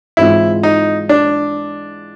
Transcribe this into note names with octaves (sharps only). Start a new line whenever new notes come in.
G#2 E3 G#3 C4 E4 F4
D#4
D4